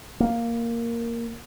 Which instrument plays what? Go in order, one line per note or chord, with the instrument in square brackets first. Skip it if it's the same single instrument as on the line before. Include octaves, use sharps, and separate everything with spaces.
[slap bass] A#3